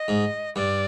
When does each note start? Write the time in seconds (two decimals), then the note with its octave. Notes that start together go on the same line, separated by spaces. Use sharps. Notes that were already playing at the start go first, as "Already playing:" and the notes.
Already playing: D#5
0.08 G#2
0.56 G2 D5